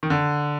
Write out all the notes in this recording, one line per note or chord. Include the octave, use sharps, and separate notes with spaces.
D#3
D3